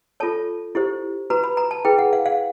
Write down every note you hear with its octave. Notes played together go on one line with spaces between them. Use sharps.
F4 A4 C#5 A5
E4 G4 C5
F#4 B4 A#5
B5
A#5
A5
E4 G#4 B4 G5
F#5
F5
F5